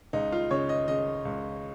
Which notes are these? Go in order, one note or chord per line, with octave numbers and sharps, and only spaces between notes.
C#2 D#4
F4
C#3 C#5
D#5
C#3 D#5
C#2